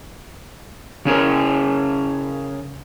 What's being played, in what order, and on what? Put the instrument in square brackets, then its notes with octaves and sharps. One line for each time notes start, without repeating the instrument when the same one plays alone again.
[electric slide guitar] C#3 C#4 G#4 A#4